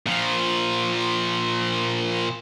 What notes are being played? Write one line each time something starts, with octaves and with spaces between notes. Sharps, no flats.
A#2 F3